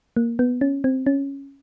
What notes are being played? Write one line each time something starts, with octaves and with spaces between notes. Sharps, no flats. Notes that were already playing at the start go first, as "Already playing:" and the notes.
A#3
B3
C#4
C4
C#4